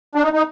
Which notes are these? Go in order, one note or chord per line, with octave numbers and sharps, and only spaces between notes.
D4
D#4
D#4